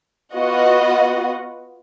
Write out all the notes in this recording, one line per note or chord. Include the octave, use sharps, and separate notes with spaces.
B3 F4 F#4 D#5 F#5